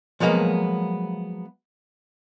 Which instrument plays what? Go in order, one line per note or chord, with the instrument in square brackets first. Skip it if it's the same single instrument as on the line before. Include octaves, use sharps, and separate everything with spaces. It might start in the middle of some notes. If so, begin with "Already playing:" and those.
[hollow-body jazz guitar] F3 F#3 G#3 A#3 B3